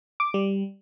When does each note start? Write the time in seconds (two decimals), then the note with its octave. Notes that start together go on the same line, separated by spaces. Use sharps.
0.20 D6
0.34 G3